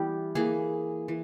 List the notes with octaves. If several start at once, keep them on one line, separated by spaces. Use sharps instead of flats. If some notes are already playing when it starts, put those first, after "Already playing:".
Already playing: E3 G3 B3 G4
E3 A#3 G#4
E3